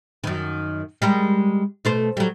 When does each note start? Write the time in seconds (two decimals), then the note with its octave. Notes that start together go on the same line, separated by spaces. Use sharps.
0.24 F#2 D#3
1.02 G3 G#3 A#4
1.85 B2 A3 C5
2.17 F#3 G3